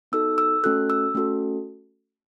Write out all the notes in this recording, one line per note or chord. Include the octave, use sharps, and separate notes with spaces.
B3 D#4 F#4 A4 E6
E6
A3 C#4 F#4 A4 F#6
E6
A3 C#4 F#4 A4